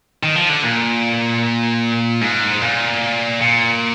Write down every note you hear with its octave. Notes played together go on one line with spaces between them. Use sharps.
D#3
F3
D3
A#2
G#2
A#2
A#2